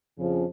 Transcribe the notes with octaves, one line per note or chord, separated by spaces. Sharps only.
F2 C#3 F3